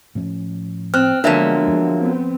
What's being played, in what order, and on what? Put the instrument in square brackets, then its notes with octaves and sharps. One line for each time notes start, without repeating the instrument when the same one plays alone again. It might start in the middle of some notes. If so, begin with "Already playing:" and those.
[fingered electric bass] A2 F3 C#4
[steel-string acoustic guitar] C4 [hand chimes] F6 F#6
[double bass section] D3 G#3 B3 [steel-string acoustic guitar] F3 F#3 A#3 [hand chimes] D4 E5
[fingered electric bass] F2
[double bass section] B3 C4